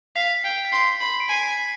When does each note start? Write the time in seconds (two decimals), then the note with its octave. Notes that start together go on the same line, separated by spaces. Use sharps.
0.16 F5 B6
0.44 G5
0.65 B6
0.72 C6 C7
1.01 B5
1.20 D7
1.29 G#5 C7
1.48 B6